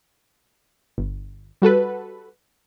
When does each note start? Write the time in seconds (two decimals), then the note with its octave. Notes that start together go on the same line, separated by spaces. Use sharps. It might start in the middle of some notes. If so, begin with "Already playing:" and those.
0.98 G1
1.62 G3 F#4 A4 B4